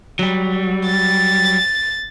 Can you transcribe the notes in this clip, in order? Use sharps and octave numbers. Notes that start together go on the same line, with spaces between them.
F#3 G3
A6